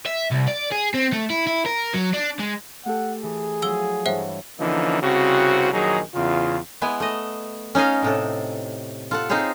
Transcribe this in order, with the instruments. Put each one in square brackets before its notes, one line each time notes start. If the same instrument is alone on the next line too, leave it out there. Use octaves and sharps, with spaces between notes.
[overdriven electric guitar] E5
C2
D5
G#4
C4
A3
E4
E4
A#4
F#3
D4
G#3
[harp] A3 G4 A4 [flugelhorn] F#5
[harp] E3 [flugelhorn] G#4
[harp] F3 F#3 E4 [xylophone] G#5 E6 G7
[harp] G2 E3 C#5 [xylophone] C5 E5 F#5
[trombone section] D3 E3 F3 A#3 C#4 D#4
C2 C#3 C4 F#4
A#1 D#3 F#3 D#4 G#4
E2 C#3 F4
[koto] G#3 B3 E4 G#5
A3 D#5
C#4 D#4 C#5 D#5 F5
A2 C3 A4
F4 A4 F#5
C4 D#4 F4 G#4 C5 C#5